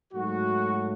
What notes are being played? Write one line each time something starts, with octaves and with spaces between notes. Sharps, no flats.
G#2 F#3 A3 F#4